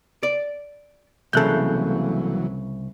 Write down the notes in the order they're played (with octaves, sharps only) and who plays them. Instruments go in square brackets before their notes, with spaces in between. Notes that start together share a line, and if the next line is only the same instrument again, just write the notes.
[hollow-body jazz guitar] D5
[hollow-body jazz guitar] C2 C#3 [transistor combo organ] E3 F#3 [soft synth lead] A#3 [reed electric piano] A4 F#6 G6